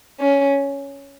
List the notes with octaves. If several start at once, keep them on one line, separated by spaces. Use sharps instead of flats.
C#4